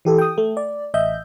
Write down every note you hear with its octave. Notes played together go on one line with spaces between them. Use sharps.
E3 G4 A4
G5 D#6
A3
D5
A1 D#5 E5 G6